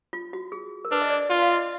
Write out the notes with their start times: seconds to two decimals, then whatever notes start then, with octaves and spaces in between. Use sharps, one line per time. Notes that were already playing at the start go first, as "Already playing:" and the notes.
0.13 F4
0.33 F#4
0.52 G#4
0.85 A#4
0.91 D4 B4
1.02 D#5
1.10 D5
1.30 F4 D5
1.42 F5
1.50 D#5